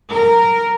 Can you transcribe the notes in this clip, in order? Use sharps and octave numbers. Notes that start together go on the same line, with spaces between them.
A#4